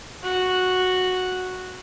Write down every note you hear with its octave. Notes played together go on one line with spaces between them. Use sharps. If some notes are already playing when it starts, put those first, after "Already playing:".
F#4